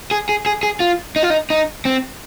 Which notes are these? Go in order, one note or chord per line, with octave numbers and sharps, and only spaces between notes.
G#4
G#4
G#4
G#4
F4
D#4
F4
D#4
D#4
C4